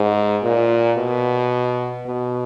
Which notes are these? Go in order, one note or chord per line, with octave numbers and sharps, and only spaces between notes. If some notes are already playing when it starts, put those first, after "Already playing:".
Already playing: G#2
A#2
B2
B2